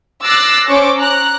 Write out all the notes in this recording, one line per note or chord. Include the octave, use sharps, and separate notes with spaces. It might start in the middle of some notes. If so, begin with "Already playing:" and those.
D6 E6 F#6 A6 A#6 C7
C#4 C5 C#6 D6
A#5 F#6